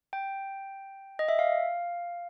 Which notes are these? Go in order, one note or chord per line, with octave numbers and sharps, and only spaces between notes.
G5
D#5
E5
F5